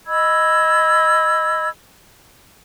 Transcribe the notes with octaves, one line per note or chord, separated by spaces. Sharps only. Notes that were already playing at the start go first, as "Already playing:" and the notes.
D#5 B5 E6 G#6